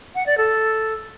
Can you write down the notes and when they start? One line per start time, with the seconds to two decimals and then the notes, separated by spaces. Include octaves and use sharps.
0.15 F#5
0.26 D5
0.38 A4